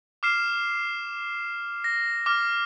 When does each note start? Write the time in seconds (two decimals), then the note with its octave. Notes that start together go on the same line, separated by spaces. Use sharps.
0.23 D6 F6 C7 E7
1.84 A#6
2.26 D6 F6